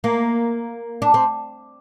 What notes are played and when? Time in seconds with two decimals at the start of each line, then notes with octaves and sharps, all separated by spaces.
0.04 A#3
1.02 D4
1.14 C4